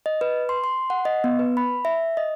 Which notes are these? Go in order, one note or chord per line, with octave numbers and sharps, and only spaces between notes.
D#5
B4
C6
C6
F#5
D#5
B3
B4
B5
E5
D#5